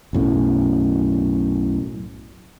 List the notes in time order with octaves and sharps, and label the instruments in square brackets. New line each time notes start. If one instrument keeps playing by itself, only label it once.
[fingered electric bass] B1 F#2 A2